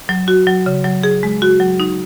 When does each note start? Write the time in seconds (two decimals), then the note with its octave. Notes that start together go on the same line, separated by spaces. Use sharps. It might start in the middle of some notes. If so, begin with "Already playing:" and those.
0.09 F#3
0.28 F#4
0.47 F#3
0.66 C#3
0.84 F#3
1.03 G#4
1.23 G#3
1.42 F#4
1.60 F#3
1.80 D#4